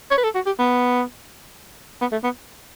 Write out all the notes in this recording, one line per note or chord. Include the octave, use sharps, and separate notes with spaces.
C#5
B4
A4
F#4
G4
B3
B3
A3
B3